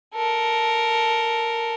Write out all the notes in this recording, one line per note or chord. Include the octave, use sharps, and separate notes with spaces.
A4 A#4